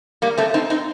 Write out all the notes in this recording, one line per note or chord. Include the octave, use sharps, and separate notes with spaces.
G3 A#3
A3 C4
C4 D#4
C4 D#4